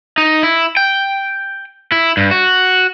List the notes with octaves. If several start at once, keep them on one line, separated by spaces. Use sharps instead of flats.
D#4
E4
G5
E4
G2
F#4